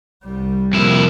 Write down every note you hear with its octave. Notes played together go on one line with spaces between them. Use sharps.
C2 G3
F2 C3 A#3 E4